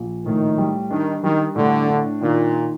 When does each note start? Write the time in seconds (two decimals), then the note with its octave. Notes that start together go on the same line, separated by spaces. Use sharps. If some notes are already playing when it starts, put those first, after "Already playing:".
Already playing: A#1
0.25 A2 D#3
0.58 G3
0.91 D#3 D4
1.23 D#3 G3
1.55 A2 D3
1.88 D4
2.21 A#2 D#3